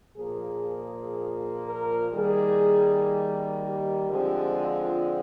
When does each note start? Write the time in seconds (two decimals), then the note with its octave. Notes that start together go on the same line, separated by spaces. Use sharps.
0.17 A#2 F3 A#3 G#4
0.65 G#4
1.64 A#4
2.13 D#3 G3 A#3 G#4
3.61 G4
4.09 D3 F3 G#3 C4
4.59 F4